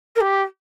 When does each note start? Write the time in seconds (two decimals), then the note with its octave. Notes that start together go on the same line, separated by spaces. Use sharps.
0.16 A#4
0.20 G4